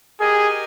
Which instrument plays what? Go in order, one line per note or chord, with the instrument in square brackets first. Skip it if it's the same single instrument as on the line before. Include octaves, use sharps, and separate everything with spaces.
[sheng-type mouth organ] G4 A#4 D#5 G#5 [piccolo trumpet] G#4